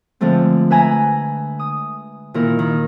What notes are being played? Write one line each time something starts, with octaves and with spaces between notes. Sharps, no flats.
D3 F3 G#3 A3 C4
B4 E5 G#5 A#5 B5
D#6
A#2 D#3 E4 A#4
D#3